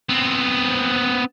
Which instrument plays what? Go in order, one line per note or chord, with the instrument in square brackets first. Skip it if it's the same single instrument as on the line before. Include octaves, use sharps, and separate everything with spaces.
[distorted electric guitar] B3 C4